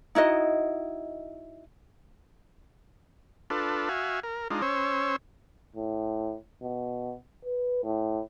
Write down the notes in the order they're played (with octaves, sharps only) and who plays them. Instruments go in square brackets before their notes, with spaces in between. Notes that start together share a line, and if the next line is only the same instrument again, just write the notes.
[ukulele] D#4 E4 F#4 D#5
[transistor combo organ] D4 F4 A4 B4
F#4 E5 F5 G#5
A#4
G#3 D4 D#4 F4
C#4 C5 C#5 E6
[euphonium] A2
B2
B4
A2